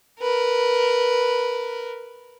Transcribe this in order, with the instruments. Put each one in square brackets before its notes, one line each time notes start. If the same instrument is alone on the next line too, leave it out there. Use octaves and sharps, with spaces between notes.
[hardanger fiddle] A#4 B4